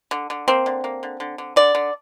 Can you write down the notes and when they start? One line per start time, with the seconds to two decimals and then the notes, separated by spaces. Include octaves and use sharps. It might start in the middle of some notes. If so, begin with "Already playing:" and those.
0.11 D3
0.30 D3
0.48 A#3 C4
0.66 D3
0.84 A#3
1.03 D3
1.20 D3
1.38 D3
1.56 D3 D5
1.75 D3